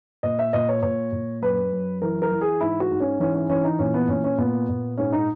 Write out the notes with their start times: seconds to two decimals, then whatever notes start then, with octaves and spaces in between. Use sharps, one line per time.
0.23 A#2 D#5
0.39 E5
0.53 A#2 D#5
0.69 C#5
0.83 A#2 C#5
1.12 A#2
1.42 F#2 B4
1.72 F#2
2.02 E3 A#4
2.22 A#4
2.32 E3
2.41 G#4
2.61 G#2 E4
2.80 F#4
2.91 G#2
3.00 C#4
3.20 E3 C#4
3.35 C#4
3.50 E3 C#4
3.64 D#4
3.79 A#2 C#4
3.94 B3
4.09 A#2 C#4
4.24 C#4
4.38 A#2 B3
4.69 A#2
4.98 G#2 C#4
5.12 D#4